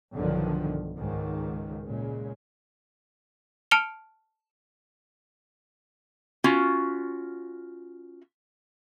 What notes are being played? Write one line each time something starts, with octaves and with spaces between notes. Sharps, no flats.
B1 G2 D3 D#3 F3
C#2 G#2 D#3
A#2 C#3 G#3
A5 F6 C#7 D7 F7 G7
C#4 F4 F#4